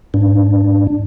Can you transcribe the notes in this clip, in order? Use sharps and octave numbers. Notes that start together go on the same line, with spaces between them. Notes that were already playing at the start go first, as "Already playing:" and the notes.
G#2 D4